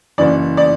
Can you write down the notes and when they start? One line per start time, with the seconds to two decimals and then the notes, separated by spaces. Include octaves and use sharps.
0.18 F#1 F#2 E3 D5
0.57 D5